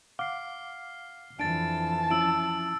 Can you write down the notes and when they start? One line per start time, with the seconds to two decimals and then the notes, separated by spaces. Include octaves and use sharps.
0.19 F5 F#5 D6 F6 C7
1.39 F2 E3 D4 A5 A6 D7
2.11 F3 C#4 E4 E6 D7